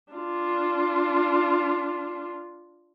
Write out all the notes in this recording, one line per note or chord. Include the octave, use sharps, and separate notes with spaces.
D4 F4